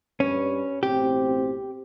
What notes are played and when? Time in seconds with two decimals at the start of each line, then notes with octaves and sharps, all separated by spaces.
0.20 G2 G3 C#4 B4
0.83 A1 B2 C4 G4